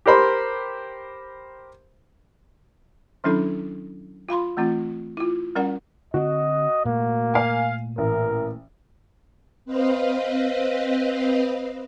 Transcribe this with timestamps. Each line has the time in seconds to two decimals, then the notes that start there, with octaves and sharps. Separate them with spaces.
0.06 G4 A#4 C5 B5 C6
3.24 D#3 F#3 C#4 D4 E4 A4
4.29 F4 F5 B5 C6
4.57 E3 A3 C4 F4
5.17 E4 F4
5.55 G3 C#4 A#4 D5 F#5
6.14 D3 C4 F#4 D#5
6.85 A#2 A3 A#3
7.34 F5 G#5
7.98 A1 A#4
9.65 C4 B4 C5 D#5 F5